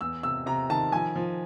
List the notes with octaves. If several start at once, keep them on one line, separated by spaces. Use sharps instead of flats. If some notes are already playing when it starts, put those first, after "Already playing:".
E2 E6
C3 E6
C3 A#5
D#3 A5
F3 G#5
F3